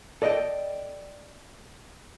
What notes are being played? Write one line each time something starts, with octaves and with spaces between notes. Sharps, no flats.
A4 D5 D#5 F#5 G5